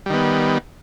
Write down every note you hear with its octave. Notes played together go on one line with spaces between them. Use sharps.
D#3 G3 B3